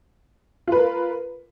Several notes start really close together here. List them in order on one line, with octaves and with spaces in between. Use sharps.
F4 B4 A#4